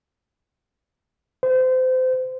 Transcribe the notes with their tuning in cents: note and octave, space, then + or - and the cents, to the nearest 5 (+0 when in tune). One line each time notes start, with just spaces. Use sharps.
C5 -30